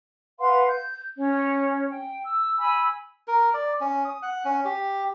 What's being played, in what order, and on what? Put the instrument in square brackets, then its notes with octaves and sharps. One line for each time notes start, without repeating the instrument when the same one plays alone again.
[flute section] B4 F5 F#5 C6
G6
C#4 C#5
G5
E6
G#5 B5 E6
[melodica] A#4
D5
C#4
D#6
F#5
C#4
G4